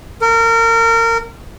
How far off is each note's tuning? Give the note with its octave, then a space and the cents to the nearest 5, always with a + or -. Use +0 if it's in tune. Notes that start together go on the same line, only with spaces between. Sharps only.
A#4 -30